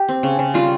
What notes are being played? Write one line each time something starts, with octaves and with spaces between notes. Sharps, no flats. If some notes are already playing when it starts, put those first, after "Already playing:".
Already playing: G4
C4
C#3
C#3
G3 F4